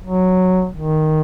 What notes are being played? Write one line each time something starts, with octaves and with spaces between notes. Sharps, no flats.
F#3
D#3